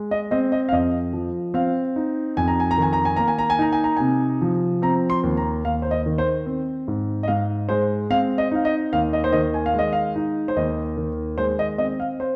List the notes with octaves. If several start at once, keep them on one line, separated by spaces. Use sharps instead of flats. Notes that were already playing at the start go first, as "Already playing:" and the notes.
Already playing: G#3
D#5
C4 D#5
D#5
F5
F2 D#5
F3
C4 F5
D#4
F2 G#5
A#5
G#5
A#5
D#3 G#5
A#5
G#5
A#3 A#5
G#5
A#5
G#5
D#4 A#5
G#5
A#5
C3 G#5
F3
C4 A#5
C6
D#2
A#5
D#2 F5
C5
D#5
D#3
C5
C4
G#2
D#5
G#2 F5
G#3 C5
C4 F5
D#5
D#4 F5
D#5
D#2 F5
D#5
C5
D#3 D#5
G#5
F5
G#3
D#5
F5
D#4
C5
D#2 D#5
D#3
G#3 C5
D#5
C4 D#5
F5
C5